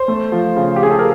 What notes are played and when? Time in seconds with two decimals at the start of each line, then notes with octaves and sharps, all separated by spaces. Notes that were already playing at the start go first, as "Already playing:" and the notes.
Already playing: C5
0.08 A3
0.32 F3
0.56 C#3
0.76 G4
0.82 C#3 G#4
0.91 A4
0.99 A#4